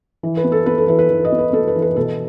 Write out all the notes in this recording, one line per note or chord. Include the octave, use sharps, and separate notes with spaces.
E3
B4
B3
A4
B3 B4
A4
E3 B4
B4
E3
D#5
B3
B4
B3 A4
B4
E3
B4
B2 A4